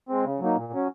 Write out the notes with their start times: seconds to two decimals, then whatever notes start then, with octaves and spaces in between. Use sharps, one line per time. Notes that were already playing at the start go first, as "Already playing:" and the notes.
0.09 G#3 C4
0.25 C#3
0.40 F#3 A#3 D#4
0.56 A#2
0.72 F#3 C#4